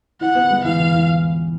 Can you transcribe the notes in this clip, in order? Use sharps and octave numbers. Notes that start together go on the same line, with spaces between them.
E4 F#5
B3
G#3
E3 F5
E3
E3